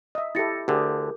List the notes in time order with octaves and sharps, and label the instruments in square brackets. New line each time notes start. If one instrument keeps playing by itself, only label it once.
[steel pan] D#5 E5
[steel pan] E4 G4 A4 [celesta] A6 A#6 C#7
[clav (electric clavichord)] D2 D3 [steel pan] G4 G#4 [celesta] A#4